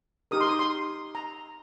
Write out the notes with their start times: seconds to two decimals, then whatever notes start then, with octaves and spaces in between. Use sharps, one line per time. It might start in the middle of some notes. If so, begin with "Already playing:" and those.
0.31 D#4 G4 A#4 D#6
0.41 C6
0.49 D#6
0.59 C6
1.15 A#5